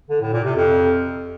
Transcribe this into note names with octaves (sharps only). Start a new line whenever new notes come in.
D3
A2
A#2
C3
F2